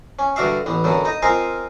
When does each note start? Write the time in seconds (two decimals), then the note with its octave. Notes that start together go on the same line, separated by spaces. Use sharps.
0.19 C#4
0.36 G2 D3 F#4 D5 E5 F5
0.66 A1 B3
0.84 F#2 D3 F#3 B3
1.05 D#4 D#5
1.22 C4 F4 A#4 D#5 F5 G#5